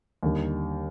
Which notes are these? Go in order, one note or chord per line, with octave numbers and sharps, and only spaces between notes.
D#2 D3 G3